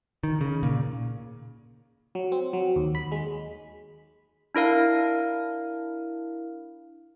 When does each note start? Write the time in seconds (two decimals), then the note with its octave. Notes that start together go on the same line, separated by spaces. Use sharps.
0.23 D#3
0.41 C#3
0.63 A#2
2.15 F#3
2.32 C4
2.53 F#3
2.76 D#2
2.95 B5
3.12 G#3
4.55 D4 E4 A#4 F5